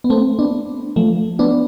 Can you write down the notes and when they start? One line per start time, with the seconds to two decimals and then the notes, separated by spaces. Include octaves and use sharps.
0.04 B3
0.10 A3 C4
0.39 B3 D4
0.96 F3 A3
1.39 B3 D4